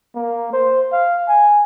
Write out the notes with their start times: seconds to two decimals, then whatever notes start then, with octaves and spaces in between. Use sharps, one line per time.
0.15 A#3
0.53 C5
0.92 F5
1.28 G#5